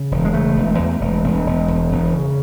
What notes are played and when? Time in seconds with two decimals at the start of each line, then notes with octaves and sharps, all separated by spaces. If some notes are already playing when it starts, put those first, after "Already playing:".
Already playing: C#3
0.11 E1
0.25 G#3
0.33 C#3 A3
0.56 E1
0.79 E2
1.01 E1
1.23 E1
1.46 E1
1.68 E1
1.91 E1
2.13 C#3